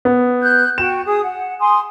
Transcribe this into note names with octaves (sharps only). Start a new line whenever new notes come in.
B3
F#6 G6
F#4 G5 E7
G#4 D#6
F#5
G#5 C6 D#6